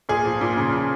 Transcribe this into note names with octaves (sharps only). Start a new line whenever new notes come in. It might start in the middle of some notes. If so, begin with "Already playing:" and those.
A#2 G#4
F3
A#2
C#3
F3